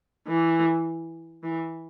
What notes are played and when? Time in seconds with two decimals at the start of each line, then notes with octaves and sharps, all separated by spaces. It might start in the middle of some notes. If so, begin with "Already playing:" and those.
0.28 E3
1.43 E3